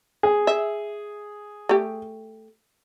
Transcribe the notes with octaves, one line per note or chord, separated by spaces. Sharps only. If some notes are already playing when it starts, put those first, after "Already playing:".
G#4
E5
A3 G4